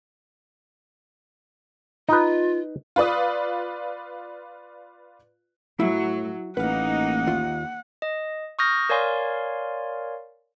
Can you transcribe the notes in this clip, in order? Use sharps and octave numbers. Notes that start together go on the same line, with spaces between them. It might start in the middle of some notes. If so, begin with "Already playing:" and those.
D#4 F4 B4
F4 B4 D5 D#6
A2 F#3 E4
A1 A#3 D#4 B4 F5 F#5
D#2 F4
D#5
C#6 D#6 F6 G6 A#6
A#4 C#5 D5 F5 G#5 C6